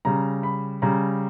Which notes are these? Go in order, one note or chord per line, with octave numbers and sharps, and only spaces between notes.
C#3 G3 A#5
B5
C#3 G3 A#5